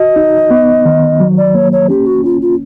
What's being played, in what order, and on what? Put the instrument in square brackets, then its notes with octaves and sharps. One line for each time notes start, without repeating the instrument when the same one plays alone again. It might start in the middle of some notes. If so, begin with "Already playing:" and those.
Already playing: [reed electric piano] F#4 [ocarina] D#5
[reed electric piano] D#4
B3
D#3
F#3
[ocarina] D5
[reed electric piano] A#3 [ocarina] C#5
[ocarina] C#5
[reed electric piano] C#4 [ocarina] G4
[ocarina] F#4
[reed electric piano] C#4 [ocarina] F4
[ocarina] F4